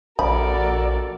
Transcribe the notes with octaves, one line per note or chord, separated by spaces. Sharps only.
A#1 F#4 A4 A#4 D5 B5